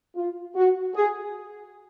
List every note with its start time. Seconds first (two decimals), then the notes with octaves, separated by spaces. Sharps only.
0.15 F4
0.55 F#4
0.95 G#4